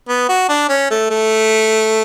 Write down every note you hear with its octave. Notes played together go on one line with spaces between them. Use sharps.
B3
F#4
D4
C#4
A3
A3